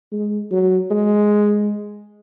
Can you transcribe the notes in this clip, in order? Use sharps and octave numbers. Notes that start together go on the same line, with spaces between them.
G#3
F#3
G#3